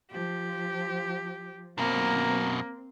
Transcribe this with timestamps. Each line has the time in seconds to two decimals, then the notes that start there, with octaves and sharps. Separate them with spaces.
0.12 F3 G4
1.78 F#2 B2 A#3 C4